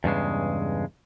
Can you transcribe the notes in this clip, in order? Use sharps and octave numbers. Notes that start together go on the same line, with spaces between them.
E2 G2 C#3 G#3